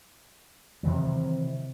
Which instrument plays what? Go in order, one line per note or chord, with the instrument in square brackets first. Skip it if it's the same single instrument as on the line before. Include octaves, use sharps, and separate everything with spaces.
[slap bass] C3 D#3 E3 F#3